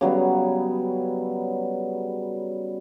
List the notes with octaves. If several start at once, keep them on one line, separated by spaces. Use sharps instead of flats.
C#3 F#3 G3 B3